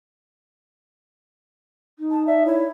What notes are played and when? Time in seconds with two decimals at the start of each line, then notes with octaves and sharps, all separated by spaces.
1.98 D#4
2.11 A5
2.27 D5 E5
2.45 E4 C#5